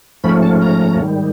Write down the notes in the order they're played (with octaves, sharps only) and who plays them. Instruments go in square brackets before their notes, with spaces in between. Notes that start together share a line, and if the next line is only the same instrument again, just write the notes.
[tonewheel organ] G#2 F3 A3 C#4 B5
A5
A#5
G#2 D#3 G3